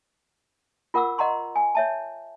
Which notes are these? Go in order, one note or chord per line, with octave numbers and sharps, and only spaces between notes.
F4 A#4 F#5 D6 E6
D#5 F#5 A#5 C6 C#6
G#5
C#5 E5 A5